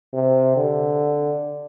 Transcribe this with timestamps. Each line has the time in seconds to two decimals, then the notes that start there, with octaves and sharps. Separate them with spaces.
0.13 C3
0.56 D3